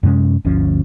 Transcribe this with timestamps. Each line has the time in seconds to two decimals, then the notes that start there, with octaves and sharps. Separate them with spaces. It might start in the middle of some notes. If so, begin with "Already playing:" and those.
0.03 F#2 C3 G#3 C#4
0.45 G1 D2 F3 C#4